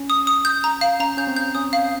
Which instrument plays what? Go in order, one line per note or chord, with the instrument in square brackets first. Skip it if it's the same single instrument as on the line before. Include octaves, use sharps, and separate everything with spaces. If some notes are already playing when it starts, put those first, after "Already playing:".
Already playing: [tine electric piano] C#4
[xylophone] D#6
D#6
G6
A#5
F5
[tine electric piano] C#4 [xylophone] A#5
[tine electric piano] C#4 [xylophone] G6
[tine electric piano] C4
[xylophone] G6
[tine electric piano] C#4 [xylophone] D#6
[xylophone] F5